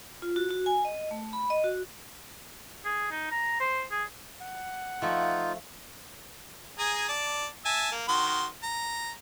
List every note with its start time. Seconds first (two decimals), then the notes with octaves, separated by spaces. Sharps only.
0.22 F4
0.36 F#4
0.51 F#4
0.66 G#5
0.85 D#5
1.11 A3
1.33 B5
1.50 D#5
1.64 F#4
2.85 G#4
3.11 D#4
3.31 A#5
3.60 C5
3.91 G#4
4.41 F#5
5.02 F3 A3 D#4 F4
6.79 G#4 G#5 A#5
7.09 D5 A5
7.65 E5 G#5 A5
7.91 A#3
8.08 D#3 F#4 C6
8.63 A#5